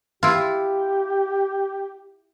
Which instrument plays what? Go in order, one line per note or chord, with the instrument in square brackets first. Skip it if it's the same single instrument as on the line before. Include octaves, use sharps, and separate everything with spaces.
[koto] E4 F4 [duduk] G4